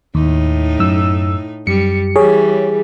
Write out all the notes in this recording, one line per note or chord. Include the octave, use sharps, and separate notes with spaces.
D#2 A2 D#4
F#2 E6
F#2 G3 C#7
E3 G3 G#4 C#5